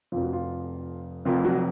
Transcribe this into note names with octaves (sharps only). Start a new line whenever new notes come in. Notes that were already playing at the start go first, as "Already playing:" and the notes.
F1 F2 F3 F4
F#4
F4
F1 F2 F3 F4
F#3 F#4